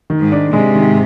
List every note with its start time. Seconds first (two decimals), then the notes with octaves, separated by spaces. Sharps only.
0.10 D#3
0.21 G#2
0.32 D4
0.53 G#2 C3 G#3
0.75 D#3